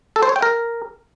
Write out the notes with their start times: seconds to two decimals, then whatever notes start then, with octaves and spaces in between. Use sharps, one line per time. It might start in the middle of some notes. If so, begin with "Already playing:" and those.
0.16 A4
0.23 C5
0.29 C#5
0.36 G5
0.42 A#4